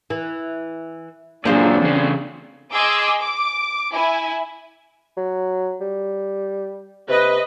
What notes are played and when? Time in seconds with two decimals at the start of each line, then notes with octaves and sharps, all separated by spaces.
0.10 E3
1.45 F#2 A#2 C4 D4 F4 G#4
1.82 E2 C#3
2.72 G#4 D#5 G#5 C6 D6 E6
3.20 D6
3.92 E4 G#5
5.17 F#3
5.81 G3
7.09 C3 B4 D#5